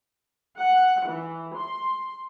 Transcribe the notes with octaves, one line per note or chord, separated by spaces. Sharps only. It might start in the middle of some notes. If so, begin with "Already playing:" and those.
F#5
E3
C6